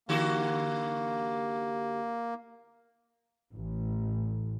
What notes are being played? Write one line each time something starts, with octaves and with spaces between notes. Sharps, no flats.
D3 A#3 F#4 G4
A1